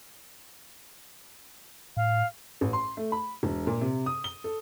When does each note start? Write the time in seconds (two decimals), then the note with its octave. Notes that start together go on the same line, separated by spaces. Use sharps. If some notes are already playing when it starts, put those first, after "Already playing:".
1.97 A2 F5
2.61 A1
2.73 C6
2.97 A3
3.12 B5
3.43 E1
3.67 A#2
3.81 C3
4.06 D#6
4.24 G7
4.44 A4